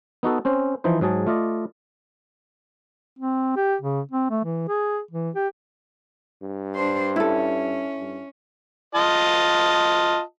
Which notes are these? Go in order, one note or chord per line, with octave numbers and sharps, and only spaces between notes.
B3 D#4 F#4 A4
C4 C#4 C5
E3 F3 D#4 C5
G#2 F#3 G#4 A5
A3 F4 D5 D#5
C4
G4
C#3
C4
A3
E3
G#4
E3
G4
G2
D4 C5
C#4 E4 A4
G2
F4 D#5 A5